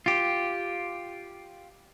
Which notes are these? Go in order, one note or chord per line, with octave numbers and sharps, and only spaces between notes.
F4 G4